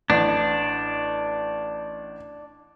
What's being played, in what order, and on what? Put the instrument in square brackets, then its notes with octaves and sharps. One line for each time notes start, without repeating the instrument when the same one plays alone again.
[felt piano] A1 [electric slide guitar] D4